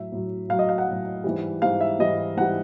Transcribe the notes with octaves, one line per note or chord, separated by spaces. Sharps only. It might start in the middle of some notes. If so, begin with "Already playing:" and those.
Already playing: A2 F#3 E5
A2 F#3
A2 F#3 F5
D#5
F5
F#5
A2 F#3
G#2 E3 G3
G#2 E3 G3 F5
E5
G#2 E3 G3 D#5
G#2 E3 G3 F#5